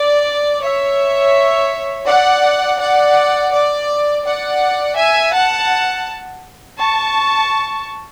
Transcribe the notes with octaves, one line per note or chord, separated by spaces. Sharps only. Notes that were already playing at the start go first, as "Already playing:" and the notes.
Already playing: D5
C#5 E5
D5 F#5
D5 F#5
D5
D5 F#5
E5 G#5
F#5 A5
A5 C#6